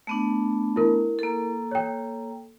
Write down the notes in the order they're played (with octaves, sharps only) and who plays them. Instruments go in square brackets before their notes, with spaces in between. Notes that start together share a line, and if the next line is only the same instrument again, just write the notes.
[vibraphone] A3 B3 D4
[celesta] E4 A#4
[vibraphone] A#3 A4
[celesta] C#5 G5